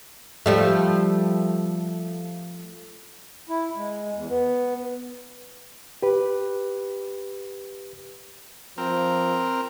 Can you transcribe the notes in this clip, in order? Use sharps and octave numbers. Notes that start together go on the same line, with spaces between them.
F3 G3 A3
E4
G#3
E2
B3
G4 B4
F3 C4 A#4